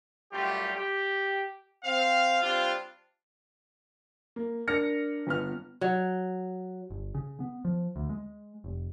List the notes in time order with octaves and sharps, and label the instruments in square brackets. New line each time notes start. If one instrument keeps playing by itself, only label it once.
[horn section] F#2 G3 A3 F4 G4
G4
C4 F5
G3 C4 D4 F4
[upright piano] A#3
D4 A#4 F6 A#6 C#7
G1 B3 F6
[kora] F#3
[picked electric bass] G1
C#3
B3
F3
D2
G#3
F1